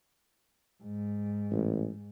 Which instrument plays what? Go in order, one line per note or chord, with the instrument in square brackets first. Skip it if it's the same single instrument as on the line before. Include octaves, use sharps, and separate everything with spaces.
[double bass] G#2
[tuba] A1